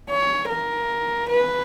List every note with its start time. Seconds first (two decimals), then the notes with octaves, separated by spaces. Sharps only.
0.10 C#5
0.49 A#4
1.28 B4